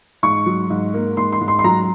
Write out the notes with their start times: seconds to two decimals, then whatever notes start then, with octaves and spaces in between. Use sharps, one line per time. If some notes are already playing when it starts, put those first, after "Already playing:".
0.23 G#2 C#6
0.46 F#3
0.70 G#2
0.94 A#3
1.17 G#2 C6
1.32 C6
1.41 G#2
1.48 C6
1.59 C6
1.64 F#3 A#5